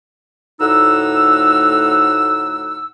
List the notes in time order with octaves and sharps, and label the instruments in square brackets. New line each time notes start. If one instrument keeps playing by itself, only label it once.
[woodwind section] D2 A2 D#4 F#5 E6